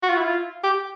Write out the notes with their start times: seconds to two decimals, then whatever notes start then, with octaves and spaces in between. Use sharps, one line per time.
0.03 F#4
0.10 F4
0.17 E4
0.24 F4
0.64 G4